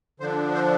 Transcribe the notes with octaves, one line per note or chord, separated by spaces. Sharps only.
D3 F3 D4 C5
C5